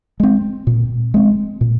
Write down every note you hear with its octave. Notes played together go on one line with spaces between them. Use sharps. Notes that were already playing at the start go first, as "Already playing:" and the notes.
G#3 C4
A#2
G#3 C4
A#2